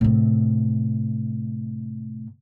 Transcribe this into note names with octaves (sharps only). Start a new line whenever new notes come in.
A2 C3